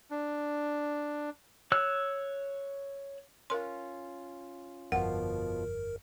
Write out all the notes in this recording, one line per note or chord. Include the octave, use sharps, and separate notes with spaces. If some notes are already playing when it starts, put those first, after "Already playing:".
D4
C#5 E6 F#6
C#4 F4 A#4 C6
G1 F2 B2 F3 F4 A#4 F#5